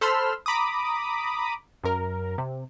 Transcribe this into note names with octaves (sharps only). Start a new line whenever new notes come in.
A4 C5 B5 C6 E6 F6
A#5 B5 D6 D#6
F#2 A#4
C3